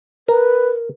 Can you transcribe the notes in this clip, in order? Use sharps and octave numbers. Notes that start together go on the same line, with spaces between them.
A#4 B4